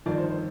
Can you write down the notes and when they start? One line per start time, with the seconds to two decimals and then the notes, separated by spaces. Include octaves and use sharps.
0.06 G1 F2 D#3 D5
0.18 C5
0.30 C5